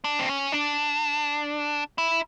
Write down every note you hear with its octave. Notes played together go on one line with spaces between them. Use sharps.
D4
C4
C#4
D4
E4